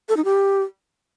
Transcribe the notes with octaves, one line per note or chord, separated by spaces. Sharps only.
A4
D#4
G4